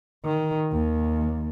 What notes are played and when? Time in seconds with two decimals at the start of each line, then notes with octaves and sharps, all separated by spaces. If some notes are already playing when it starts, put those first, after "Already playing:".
0.24 D#3
0.72 D#2